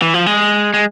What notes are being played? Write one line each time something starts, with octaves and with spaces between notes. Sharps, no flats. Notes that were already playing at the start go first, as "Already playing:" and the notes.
E3
F3
G#3
G#3